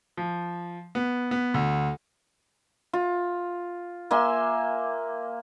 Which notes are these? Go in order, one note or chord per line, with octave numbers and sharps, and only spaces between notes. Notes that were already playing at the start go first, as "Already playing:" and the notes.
F3
B3
B3
D2
F4
A#3 E5 G#5 C6